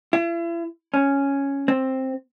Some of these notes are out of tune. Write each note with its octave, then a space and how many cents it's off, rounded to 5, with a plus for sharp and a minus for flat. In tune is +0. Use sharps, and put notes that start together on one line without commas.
E4 +40
C#4 +0
C4 +10